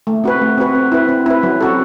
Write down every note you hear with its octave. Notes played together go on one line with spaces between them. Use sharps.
A3
C4 F#4 B4
A3
C4 F#4 B4
C4
E4 B4
C4
E4 B4
F#3
C4 F#4 A4